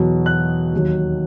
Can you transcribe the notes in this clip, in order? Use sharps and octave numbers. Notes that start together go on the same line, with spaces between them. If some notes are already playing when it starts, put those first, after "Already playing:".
Already playing: E2 B2 F#3
F#6
D#2 D#3 F#3